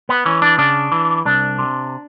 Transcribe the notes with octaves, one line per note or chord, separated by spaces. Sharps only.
B3
E3 C#4
D4
C#3 D4
E3
C2 D4
C3